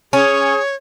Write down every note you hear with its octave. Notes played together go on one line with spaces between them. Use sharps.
C#4 G#4 C#5